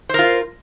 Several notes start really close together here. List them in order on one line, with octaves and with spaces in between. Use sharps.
C5 A#4 F4